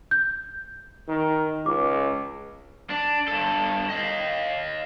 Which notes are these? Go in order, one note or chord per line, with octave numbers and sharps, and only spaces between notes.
G6
D#3
C#2 D6
D4
G2 A4
D#5 F5